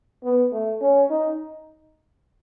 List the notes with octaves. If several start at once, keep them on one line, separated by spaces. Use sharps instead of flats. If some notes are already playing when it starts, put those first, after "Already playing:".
B3
A3
C#4
D#4